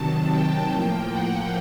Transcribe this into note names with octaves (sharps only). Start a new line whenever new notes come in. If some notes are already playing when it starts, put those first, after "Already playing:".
Already playing: C3 D#3 F#3 A5
G5
A2 F3 A#3
F#5